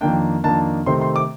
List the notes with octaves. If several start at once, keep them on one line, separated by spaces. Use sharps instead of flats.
F2 D#3 A#3 D4 G5
F2 D#3 A#3 D4 A5
C3 D#3 A3 C4 C6
C6
D6